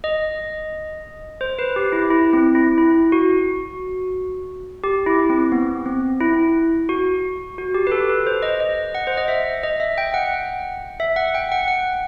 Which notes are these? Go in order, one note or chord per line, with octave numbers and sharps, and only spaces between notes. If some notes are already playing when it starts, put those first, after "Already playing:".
D#5
C5
B4
G4
E4
E4
C4
E4
E4
F#4
G4
E4
C4
B3
C4
E4
F#4
F#4
G4
B4
A4
B4
C5
D#5
D#5
F#5
C5
D#5
E5
D#5
E5
G5
F#5
E5
F#5
G5
F#5
F#5